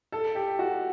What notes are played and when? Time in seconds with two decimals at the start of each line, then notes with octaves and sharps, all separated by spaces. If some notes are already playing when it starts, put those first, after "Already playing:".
0.12 A4
0.35 G4
0.59 F#4